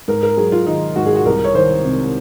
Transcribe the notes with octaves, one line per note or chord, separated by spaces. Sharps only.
G#2 A#4
A#4
F#3 G#4
F4
D#3 D#4
G#2 F#4
G#4
F#4
C2 A#4
C#5
D#3 C5
C3